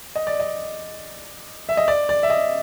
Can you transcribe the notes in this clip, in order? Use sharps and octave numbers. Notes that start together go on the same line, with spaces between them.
D#5
D5
D#5
E5
D#5
D5
D5
E5
D#5